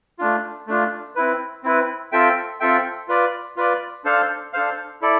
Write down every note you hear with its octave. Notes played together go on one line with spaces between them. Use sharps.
A3 D4 F4
A3 D4 F4
C4 E4 B4
C4 E4 B4
C4 F4 A4 E5 G5
C4 F4 A4 E5 G5
F4 B4 D5
F4 B4 D5
D4 A4 C5 F5
D4 A4 C5 F5
E4 A4 D5